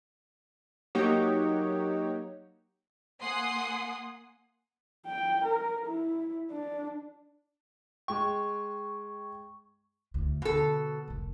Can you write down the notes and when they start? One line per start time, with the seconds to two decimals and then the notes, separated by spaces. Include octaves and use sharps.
0.95 F#3 A#3 D#4 F#4 G4 C#5
3.22 A#3 F#5 G#5 C6 D#6 C7
5.06 G5
5.44 A#4
5.86 E4
6.50 D4
8.08 G#3 G5 C#6
10.14 D2 E4
10.42 B2 D3 A4
11.08 F1 D#3